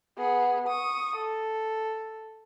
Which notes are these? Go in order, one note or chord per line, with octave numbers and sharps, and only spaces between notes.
B3 G#4
C#6 D#6
A4